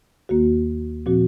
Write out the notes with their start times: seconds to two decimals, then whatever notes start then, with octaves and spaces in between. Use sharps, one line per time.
0.29 D#2 D#3 A#3 F#4
1.06 A#2 F3 C4 F#4